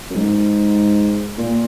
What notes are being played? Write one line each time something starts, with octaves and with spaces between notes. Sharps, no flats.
F#2
G#2
A#2